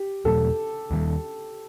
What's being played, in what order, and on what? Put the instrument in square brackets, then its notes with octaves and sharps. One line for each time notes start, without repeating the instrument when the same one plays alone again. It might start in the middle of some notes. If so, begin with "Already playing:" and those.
Already playing: [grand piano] G4
[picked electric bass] E2 B2 F#3 A3 [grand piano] A4
[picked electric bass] D#2 D#3 G3